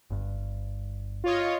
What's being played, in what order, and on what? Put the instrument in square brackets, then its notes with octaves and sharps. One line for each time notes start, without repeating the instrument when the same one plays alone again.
[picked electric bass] G1 G2
[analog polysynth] F4 C#5 D#5